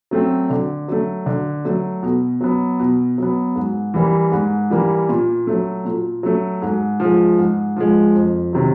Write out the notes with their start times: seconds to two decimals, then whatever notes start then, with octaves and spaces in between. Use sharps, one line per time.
0.11 F#3 A3 C4
0.50 D3
0.88 F#3 A3
1.26 D3
1.65 F#3 A3
2.03 B2
2.41 F#3 B3
2.80 B2
3.18 F#3 B3
3.56 G#2
3.94 E3 G3 A#3
4.32 G#2
4.70 E3 G3 A#3
5.09 A#2
5.47 F#3 A3
5.85 A#2
6.23 F#3 A3
6.62 G#2
7.00 F3 G#3
7.39 G#2
7.77 F3 G#3
8.15 F2
8.53 C3 D#3 F#3